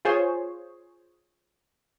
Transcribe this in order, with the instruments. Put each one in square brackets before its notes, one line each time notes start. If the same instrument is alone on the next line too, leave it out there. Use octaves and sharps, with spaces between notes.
[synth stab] F4 G#4 C5 C#5